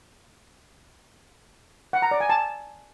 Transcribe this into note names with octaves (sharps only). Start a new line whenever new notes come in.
F#5
A#5
D5
G#5
A5